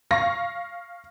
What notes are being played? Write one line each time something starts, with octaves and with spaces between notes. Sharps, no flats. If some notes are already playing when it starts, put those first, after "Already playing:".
F5 C#6 A#6